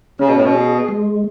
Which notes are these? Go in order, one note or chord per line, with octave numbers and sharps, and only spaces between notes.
C#3 C#4
B2
A2
B2
G#4
G#3